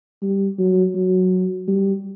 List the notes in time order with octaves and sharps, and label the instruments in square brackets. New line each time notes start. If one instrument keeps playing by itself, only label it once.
[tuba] G3
F#3
F#3
G3